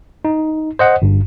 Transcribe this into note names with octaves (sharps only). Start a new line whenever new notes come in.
D#4
C5 D#5 F#5
G1 G2